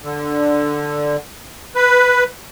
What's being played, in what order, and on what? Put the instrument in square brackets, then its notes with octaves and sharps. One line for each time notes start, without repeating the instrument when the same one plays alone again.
[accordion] D3
B4